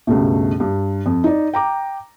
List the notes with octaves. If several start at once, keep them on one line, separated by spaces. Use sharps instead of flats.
C#2 G2 B2 A3
G2
F2
D#4 D5
G5 A#5 D6